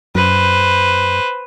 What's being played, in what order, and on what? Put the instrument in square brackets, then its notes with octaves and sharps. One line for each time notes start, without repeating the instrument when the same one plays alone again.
[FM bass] F#2 [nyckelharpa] B4 C5